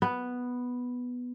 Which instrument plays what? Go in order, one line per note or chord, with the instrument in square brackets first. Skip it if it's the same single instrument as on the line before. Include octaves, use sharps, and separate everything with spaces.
[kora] B3